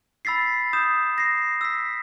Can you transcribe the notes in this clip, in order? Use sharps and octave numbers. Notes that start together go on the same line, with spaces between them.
B5 E6 A6 B6 C7
D#6 G6 E7
A#6 C7
E6 B6